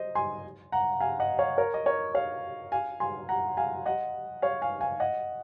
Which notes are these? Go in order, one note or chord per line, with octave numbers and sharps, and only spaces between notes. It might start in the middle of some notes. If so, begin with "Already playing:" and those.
Already playing: C5 D#5
G#5 C6
F#5 A#5
F5 G#5
D#5 F#5
C#5 F5
A#4 C#5
D#5
A#4 C#5
C#5 F5
F5 G#5
G#5 C6
F#5 A#5
F5 G#5
D#5 F#5
C#5 F5
F5 G#5
F5 G#5
D#5 F#5